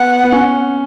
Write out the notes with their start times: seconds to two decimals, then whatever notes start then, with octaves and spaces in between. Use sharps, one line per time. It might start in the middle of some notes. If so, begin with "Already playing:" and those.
Already playing: B3 F#5
0.23 B3
0.32 C#4